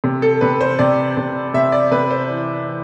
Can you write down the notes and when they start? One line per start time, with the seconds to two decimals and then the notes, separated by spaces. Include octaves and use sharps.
0.04 C3
0.22 A4
0.41 C3 B4
0.61 C5
0.79 C3 D5
1.17 C3
1.54 C3 E5
1.72 D5
1.91 C3 B4
2.11 C5
2.29 E3
2.66 E3